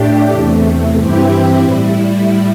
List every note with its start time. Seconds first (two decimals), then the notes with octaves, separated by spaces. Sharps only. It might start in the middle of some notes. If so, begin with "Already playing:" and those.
Already playing: A2 A3 D4 G4
0.30 E2 C3 A3
0.96 G2 E3 C4 E4 G4
1.61 A2 G3 E4